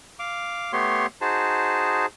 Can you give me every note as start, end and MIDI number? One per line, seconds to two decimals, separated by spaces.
0.19 0.72 77
0.19 0.72 86
0.73 1.07 57
0.73 1.07 59
0.73 1.07 67
0.73 1.07 73
0.73 1.07 84
1.21 2.06 63
1.21 2.06 66
1.21 2.06 68
1.21 2.06 72
1.21 2.06 81